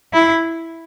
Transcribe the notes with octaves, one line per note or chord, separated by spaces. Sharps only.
E4